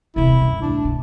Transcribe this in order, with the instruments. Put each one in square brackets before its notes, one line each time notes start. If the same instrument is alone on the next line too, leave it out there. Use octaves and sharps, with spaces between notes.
[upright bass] D#1 C3 [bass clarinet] E4
[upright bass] F#2
[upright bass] E2 A2 [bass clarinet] D4
[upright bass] B2